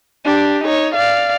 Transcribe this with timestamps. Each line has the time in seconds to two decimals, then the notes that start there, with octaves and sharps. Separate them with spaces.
0.25 D4 G4
0.64 D#4 C#5
0.95 D5 F5